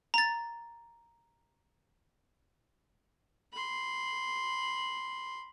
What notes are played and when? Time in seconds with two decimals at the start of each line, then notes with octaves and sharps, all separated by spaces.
0.14 A#5 A6
3.54 B5 C6